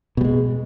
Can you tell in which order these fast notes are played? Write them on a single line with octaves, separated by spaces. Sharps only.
B2 G3 G#3